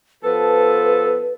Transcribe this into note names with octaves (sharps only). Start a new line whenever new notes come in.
F3 B3 A4 B4